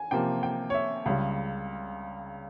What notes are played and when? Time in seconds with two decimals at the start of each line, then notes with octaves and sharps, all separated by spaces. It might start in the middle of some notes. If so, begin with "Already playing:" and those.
Already playing: G#5
0.11 C3 F3 A#3 G5
0.43 G5
0.70 C#5
0.74 E5
1.06 C#2 C#3 G3